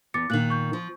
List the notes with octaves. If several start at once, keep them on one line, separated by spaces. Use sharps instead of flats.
E2 D6 A6 C#7
A#2 D#3 F#6 F#7
C#6 G6
F3